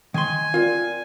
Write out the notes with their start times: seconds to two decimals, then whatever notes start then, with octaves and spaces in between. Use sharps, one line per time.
0.14 D#3 G#5 C6
0.54 C4 F4 A#4 D5